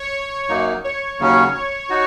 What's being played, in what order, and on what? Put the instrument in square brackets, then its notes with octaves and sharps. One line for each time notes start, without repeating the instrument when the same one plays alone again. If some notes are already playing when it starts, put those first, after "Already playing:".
Already playing: [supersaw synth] C#5
[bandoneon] F#2 F#3 A#3 D#4
[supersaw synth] C#5
[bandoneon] D#2 C#3 F#3 C#4
[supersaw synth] C#5
[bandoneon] D#4 F#4